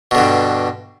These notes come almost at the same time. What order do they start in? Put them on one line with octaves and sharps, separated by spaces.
B2 D3 G2